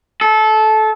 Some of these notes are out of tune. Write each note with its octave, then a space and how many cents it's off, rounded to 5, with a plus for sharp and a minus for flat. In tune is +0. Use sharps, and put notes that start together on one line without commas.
A4 -20